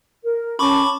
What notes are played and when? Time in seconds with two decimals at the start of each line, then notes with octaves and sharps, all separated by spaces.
0.23 A#4
0.59 C#4 A5 B5 C#6 D6